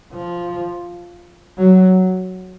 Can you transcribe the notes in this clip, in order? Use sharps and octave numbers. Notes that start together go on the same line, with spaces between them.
F3
F#3